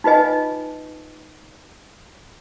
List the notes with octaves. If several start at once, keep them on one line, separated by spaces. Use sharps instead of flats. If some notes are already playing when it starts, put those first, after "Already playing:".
D#4 F4 B4 D#5 G#5